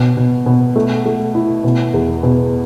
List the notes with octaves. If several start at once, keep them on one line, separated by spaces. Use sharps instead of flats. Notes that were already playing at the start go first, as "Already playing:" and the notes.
Already playing: B2
B2
B2
A3
A3
E4
B2
E2
B2